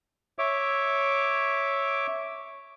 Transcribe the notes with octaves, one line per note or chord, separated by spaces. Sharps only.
C#5 E5 D6